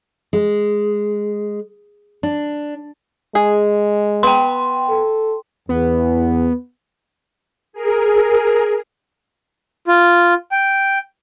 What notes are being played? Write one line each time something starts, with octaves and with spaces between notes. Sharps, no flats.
G#3
D4
G#3 G#4
B3 G5 C6
A4
E2 B3
G#4 A#4
F4
G5